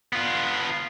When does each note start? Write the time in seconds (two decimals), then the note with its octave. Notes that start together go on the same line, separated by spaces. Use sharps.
0.13 B3 F4